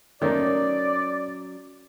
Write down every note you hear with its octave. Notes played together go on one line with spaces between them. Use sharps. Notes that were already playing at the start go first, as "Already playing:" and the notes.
D#3 F#3 A3 A#3 C#4 D5